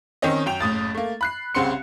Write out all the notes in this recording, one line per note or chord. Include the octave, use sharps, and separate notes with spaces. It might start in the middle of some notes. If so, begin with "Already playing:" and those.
D#3 C4 C#4 C#5 D#5
F#2 G5 F7
F#1 A2 D#6 A6
A3 A#3
B5 F#6 C7
C2 C#3 C4 F#5 C6 C#7